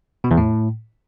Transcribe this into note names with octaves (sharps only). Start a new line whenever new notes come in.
B2
E2
A2